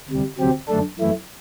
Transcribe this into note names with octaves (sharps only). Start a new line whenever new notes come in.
D2 C3 G3
D2 C3 F#3 C4 G4
F#2 D3 A3 D4 A4
F#2 E3 A3 E4